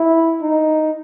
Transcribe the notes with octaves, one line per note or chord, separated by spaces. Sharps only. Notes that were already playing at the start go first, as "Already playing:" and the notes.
Already playing: E4
D#4